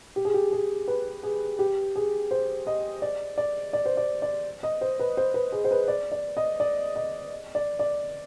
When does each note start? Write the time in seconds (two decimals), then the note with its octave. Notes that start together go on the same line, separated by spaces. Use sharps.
0.16 G4
0.25 G#4
0.34 G4
0.52 G#4
0.88 B4
1.23 G#4
1.59 G4
1.96 G#4
2.31 C5
2.67 D#5
3.02 D5
3.38 D5
3.73 D5
3.86 C5
3.97 D5
4.22 D5
4.63 D#5
4.81 C5
5.00 B4
5.17 C5
5.34 B4
5.52 G#4
5.65 C5
5.71 B4
5.88 D5
6.12 D5
6.37 D#5
6.60 D5
6.96 D#5
7.55 D5
7.79 D5